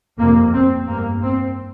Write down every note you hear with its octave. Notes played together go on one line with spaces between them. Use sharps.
F2 C3 A#3
C4
G2 A#3
C4